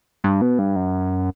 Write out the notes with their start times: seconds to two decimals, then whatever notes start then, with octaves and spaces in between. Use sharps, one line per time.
0.24 G2
0.41 B2
0.59 G2
0.76 F#2